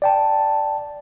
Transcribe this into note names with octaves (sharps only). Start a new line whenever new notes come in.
D5 G5 A5